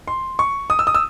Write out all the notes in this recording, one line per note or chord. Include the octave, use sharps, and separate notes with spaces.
C6
C#6
D#6
E6
D#6
E6